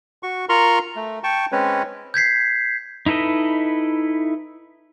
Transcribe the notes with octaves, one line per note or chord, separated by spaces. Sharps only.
F#4 C#6
F4 A#4 A#5 C6 C#6
A3
G5 A5 C#6
G#3 C4 C#4 B4 C#5
G6 G#6 B6 C7
D#4 E4 A4 B4 D#5